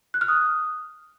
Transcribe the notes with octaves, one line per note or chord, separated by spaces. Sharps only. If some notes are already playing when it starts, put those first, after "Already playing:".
F#6
F6
D#6